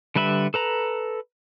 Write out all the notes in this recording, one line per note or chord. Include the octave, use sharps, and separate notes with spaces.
D3 G3 B4 E5 B5
A4 B4 A#5